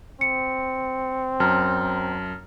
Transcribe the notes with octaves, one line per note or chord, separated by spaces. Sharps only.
C4 C#7
F#2 A5 A#5 F6